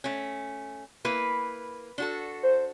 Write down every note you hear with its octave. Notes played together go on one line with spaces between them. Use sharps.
A3 C#4
A#3 E4 B4
D4 F#4 A4
C5